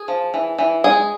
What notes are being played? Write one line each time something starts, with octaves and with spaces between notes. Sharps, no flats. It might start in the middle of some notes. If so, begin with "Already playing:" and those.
Already playing: G#4
F3
E3
E3
G#3 G#4